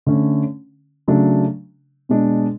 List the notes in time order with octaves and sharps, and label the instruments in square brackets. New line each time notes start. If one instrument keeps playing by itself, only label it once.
[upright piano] D3 A3 C#4
C#3 F#3 A3 D4
B2 G#3 D4